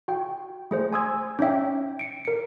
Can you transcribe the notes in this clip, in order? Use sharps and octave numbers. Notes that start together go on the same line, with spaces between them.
F#4 G5
A3 G#4 C5
G#5 C6 D#6 E6 G#6
C#4 D#4 C#5 E5 G5
C#7 D7
A#4 C#7